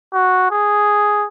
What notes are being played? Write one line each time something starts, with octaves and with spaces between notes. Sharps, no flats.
F#4
G#4